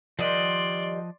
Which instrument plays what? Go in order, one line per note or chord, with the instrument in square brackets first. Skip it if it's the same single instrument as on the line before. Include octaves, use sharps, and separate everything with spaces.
[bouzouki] D#3 G3 [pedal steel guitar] F3 D#5 F#5 [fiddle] D5 C6